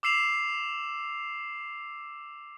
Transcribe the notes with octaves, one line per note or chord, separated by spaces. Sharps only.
D6 E6 C7 E7 F7